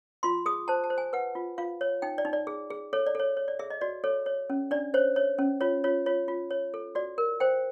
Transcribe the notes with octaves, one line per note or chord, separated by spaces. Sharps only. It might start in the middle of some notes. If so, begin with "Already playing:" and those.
F4 C6
G#4 D#6
C5 A5
A5
C5
G#5
B4 F#5
F4
F4 F5
C#5
D#4 G5
D5
D#4
D5
G#4
G#4
A4 C#5
D5
A4 C#5
C#5
D5
G#4 E5
D#5
F#4 D5
A4 C#5
C#5
C#4
D4 D5
C5 C#5
C#5
C#4
F4 C#5
F4 C#5
F4 C#5
F4
C#5
A4
F#4 D5
A#4
C5 G5